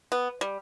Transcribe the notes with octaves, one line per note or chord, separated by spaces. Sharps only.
B3
G3